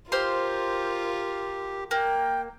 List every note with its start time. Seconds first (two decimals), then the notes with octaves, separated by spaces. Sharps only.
0.12 F4 G4 A#4 C5 F5 C6
1.91 A#3 G5